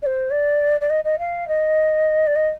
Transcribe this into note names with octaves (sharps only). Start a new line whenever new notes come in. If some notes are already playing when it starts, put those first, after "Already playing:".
D5
C5
D5
D5
D#5
D#5
F5
D#5
D5
D#5